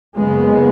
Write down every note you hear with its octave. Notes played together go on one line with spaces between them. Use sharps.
F#1 F#2 C#3 G#3 B3